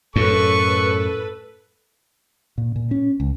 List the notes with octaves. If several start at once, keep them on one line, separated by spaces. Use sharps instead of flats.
F#2 A2 A4 B4 C#6
A#2
A#2
C#4
C#2